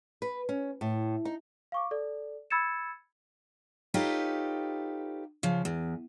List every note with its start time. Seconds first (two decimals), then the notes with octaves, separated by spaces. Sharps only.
0.22 B4
0.49 C#4
0.81 A2
1.25 D#4
1.72 F5 C#6 D6
1.91 A4 D5
2.50 B5 E6 G#6 A6 C#7 E7
3.94 D#4 F4 G4 A4 B4 C#5
5.43 C#3 F3
5.65 E2